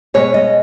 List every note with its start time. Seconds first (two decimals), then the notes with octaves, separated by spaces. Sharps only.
0.14 B2 G#3 B3 C#5
0.34 D#5